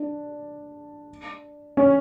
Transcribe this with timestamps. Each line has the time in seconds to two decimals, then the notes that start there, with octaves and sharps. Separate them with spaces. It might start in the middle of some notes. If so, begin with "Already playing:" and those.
Already playing: D4
1.77 C#4